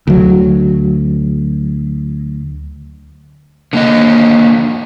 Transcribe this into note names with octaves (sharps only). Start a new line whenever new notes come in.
D2 F#3
D3 A#3 D#5